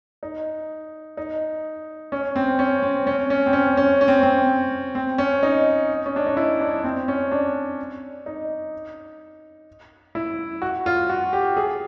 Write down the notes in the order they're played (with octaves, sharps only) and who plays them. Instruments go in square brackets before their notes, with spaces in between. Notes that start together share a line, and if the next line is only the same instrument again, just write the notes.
[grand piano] D#4
D#4
C#4
C4
C#4
C4
C#4
C#4
C4
C#4
C#4
C#4
C4
C4
C4
C#4
D#4
C#4
D4
D#4
E4
D4
C4
C#4
D4
D#4
E4
F#4
F4
F#4
G4
G#4